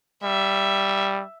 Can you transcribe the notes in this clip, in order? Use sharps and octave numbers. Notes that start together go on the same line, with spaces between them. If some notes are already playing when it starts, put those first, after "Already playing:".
G3 E5